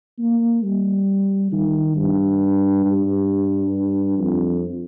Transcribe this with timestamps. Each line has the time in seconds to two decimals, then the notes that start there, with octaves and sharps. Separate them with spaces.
0.19 A#3
0.63 G3
1.52 D#3
1.96 G2
2.85 G2
4.18 F2